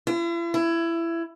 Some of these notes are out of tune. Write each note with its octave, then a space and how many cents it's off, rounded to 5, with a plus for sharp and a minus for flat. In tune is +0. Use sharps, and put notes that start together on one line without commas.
E4 +45
E4 +20